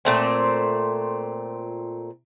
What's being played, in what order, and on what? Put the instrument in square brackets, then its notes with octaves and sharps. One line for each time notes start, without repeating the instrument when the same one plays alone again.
[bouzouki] A#2 A3 C4